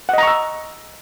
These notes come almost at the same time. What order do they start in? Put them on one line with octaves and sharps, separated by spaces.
F#5 D#5 A#5 C#6 E6